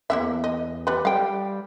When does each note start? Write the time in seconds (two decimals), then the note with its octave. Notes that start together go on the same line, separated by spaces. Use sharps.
0.10 E2 A#3 C#4 E5
0.44 D#5
0.87 G3 B4
1.05 G3 F5 G5